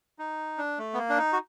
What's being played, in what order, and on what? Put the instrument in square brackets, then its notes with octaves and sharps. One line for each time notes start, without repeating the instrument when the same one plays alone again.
[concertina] D#4
D4
A3
B3
A#3
D4
D#4
F#4